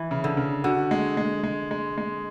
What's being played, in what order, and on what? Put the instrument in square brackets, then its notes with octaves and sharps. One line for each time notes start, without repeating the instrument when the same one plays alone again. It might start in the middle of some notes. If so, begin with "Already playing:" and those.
Already playing: [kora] E3
[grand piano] C#3
[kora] D3
[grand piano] C#3
[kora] D3 [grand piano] F#4
[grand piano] G#3
G#3
G#3
G#3
G#3